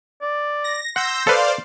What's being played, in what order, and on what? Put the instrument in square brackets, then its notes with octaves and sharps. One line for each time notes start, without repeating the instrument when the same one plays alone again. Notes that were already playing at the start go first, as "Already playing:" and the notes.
[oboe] D5
[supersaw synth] A#6
[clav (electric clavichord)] F#5 [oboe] C6 [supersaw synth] E6 G6 A#6
[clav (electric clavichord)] A4 B4 [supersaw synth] C5 D5 F5